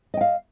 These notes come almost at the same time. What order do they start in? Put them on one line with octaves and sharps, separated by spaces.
D#5 G5 F5